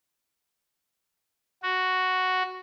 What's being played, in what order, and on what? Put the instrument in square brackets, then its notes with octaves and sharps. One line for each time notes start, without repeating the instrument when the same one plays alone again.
[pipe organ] F#4